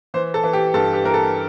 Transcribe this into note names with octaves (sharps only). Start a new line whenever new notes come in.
E3 C5
A4
E3
G4
G2 A4
G4
E3 A#4
A4